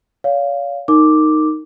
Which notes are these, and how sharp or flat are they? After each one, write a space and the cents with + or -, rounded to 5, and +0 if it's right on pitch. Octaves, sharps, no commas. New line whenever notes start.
C#5 +40 F5 +0
D#4 +0 A#4 -25 D6 +0